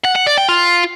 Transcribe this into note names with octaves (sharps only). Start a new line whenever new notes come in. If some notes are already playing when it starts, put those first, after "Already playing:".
F#5
F#5
D5
G5
F4